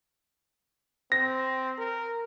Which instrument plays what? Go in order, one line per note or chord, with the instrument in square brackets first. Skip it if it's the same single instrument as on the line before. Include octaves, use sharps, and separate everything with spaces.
[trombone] C4 [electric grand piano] A#6
[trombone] A#4